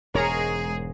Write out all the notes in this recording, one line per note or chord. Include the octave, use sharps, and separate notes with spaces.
E1 G#2 G#3 G#4 A#4 C#5 A#5